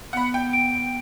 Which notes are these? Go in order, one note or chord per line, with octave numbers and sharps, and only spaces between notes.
B3 F#5 B5
G5
D7